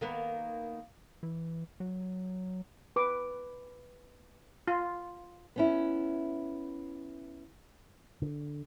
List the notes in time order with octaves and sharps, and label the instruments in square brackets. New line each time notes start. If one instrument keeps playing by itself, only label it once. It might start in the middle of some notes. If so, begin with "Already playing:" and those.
[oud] D#3 A#3 B3
[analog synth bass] E3
F#3
[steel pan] B4 D6
F4
[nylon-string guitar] B3 C#4 E4
[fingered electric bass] D3